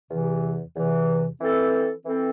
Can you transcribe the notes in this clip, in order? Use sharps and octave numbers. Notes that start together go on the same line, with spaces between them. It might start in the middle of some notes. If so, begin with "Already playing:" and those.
E2 C3 E3
E2 C3 E3
E3 C4 A4
E3 C4 A4